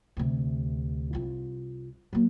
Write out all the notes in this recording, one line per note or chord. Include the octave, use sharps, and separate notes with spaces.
D2 C3
C2 F4
F#3 A#3